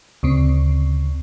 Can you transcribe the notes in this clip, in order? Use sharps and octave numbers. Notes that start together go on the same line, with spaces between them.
D2 C#3 C4